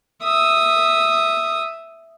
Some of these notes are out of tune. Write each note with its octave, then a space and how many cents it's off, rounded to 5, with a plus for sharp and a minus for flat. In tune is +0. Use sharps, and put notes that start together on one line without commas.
E5 +0 D#6 +0